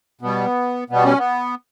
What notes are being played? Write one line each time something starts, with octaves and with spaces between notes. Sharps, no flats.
B2 G3 B3
B2 G3 B3
C#4
B3